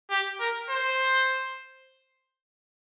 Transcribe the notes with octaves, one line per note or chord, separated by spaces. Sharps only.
G4
A#4
C5